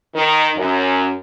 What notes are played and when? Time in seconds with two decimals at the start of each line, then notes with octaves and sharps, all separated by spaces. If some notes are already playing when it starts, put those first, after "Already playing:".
0.14 D#3
0.56 F#2